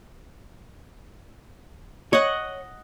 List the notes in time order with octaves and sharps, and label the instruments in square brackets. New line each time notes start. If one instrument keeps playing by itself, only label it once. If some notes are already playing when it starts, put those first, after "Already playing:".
[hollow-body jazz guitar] C#5 [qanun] D#5 F#5